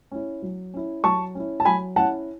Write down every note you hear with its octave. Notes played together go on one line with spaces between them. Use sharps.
C#4 E4
F#3
C#4 E4
F#3 A5 C#6
C#4 E4
A5
F#3 G#5 B5
C#4 E4 F#5 A5